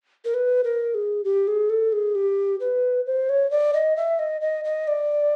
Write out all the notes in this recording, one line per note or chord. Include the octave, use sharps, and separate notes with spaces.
A#4
B4
A#4
G#4
G4
G#4
A4
G#4
G4
B4
C5
C#5
D5
D#5
E5
D#5
D#5
D#5
D5